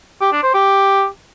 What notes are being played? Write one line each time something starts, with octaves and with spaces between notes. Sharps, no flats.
G4
D4
C5
G4